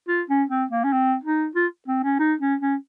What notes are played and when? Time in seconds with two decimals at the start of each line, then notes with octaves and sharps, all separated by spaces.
0.08 F4
0.29 C#4
0.50 C4
0.71 A#3
0.84 C#4
0.92 C4
1.24 D#4
1.55 F4
1.88 C4
2.03 C#4
2.19 D#4
2.40 C#4
2.61 C#4